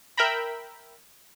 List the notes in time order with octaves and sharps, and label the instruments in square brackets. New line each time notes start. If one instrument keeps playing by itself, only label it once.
[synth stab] A#4 E5 G5 A#5 B5